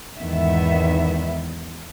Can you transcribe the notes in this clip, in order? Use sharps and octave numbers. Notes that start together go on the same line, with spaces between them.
E2 G#2 D#3 B3 E5